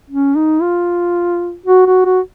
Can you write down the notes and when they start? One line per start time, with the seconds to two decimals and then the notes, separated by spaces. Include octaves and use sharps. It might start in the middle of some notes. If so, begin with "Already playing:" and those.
0.10 C#4
0.35 D#4
0.61 F4
1.66 F#4
1.86 F#4
2.05 F#4